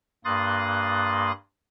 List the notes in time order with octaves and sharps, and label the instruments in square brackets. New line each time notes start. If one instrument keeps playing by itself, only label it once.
[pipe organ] G2 A#3 C6 D#6 F#6 A6